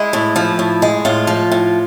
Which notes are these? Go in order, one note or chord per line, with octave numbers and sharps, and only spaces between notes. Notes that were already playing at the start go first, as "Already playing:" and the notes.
Already playing: G#3 E4
A2
F3
A2
G#3
A2 F4
F3
A2